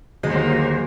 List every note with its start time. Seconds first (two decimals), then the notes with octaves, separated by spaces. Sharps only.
0.23 D1 D#2 D3 D#3 F#3 G#3 A#3 C5